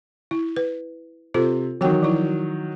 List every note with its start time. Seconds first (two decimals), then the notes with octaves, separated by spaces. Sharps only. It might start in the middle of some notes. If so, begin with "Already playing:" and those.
0.31 E4
0.56 B4
1.34 C3 F4 A4 C5
1.81 D#3 E3 F#3 F#4 G5
2.03 F3 E4